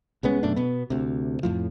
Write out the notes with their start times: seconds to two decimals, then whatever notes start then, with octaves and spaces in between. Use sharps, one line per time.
0.23 C2 G#3 B3 C#4
0.43 F#2 B2 A3 D4
0.56 B2 B3
0.90 D2 C3
1.43 F2 A2 F3